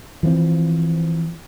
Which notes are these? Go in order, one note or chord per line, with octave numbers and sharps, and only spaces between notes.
E3 F3 A3 C4